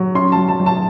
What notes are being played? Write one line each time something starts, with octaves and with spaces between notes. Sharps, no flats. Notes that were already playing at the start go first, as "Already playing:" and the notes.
Already playing: F#3
C#4 C6
F#3 A5
A5
F#3
A5